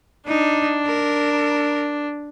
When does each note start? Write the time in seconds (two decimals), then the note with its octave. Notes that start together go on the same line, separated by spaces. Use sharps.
0.28 D4 D#4
0.87 A#4